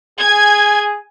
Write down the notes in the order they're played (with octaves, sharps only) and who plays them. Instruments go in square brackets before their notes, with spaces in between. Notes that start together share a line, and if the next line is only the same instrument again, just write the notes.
[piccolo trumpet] G#4 [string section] G#5 G#6